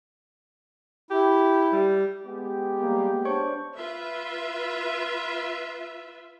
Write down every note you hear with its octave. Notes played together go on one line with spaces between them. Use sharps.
E4 G4
G3
G#3 B3 G4
G3 A#3
D4 C5 C#5 C#6
F4 B4 E5